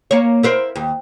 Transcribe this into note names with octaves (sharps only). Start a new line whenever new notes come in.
A#3 C#5
E4 A#4 C5
D#2